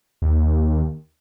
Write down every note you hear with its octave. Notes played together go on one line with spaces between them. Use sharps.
D#2